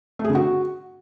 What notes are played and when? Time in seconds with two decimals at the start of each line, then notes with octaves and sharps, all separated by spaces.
0.19 A3
0.24 G#4
0.30 D3
0.35 F#4